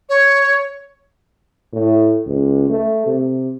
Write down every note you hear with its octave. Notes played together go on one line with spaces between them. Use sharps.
C#5
A2
C#2
A3
C3